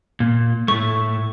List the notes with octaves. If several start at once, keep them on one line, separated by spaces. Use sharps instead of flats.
A#2
A2 A3 C#6